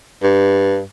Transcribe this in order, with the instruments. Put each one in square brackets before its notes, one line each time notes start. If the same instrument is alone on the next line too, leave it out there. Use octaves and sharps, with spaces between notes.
[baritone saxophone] G2